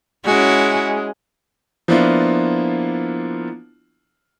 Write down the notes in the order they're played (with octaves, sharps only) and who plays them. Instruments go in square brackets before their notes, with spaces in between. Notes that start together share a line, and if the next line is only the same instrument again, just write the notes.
[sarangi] G#3 [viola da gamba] C#4 E4 F#4
[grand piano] F3 A#3 B3 D4 E4 F4